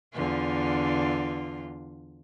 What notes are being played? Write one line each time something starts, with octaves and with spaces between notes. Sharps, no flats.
E2 D3 F4